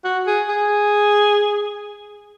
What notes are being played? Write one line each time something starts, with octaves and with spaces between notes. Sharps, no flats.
F#4
G#4
G#4